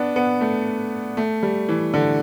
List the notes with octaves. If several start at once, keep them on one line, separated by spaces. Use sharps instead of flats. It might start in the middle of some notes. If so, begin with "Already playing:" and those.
Already playing: B3 D4
B3
A3
A3
G3
E3
D3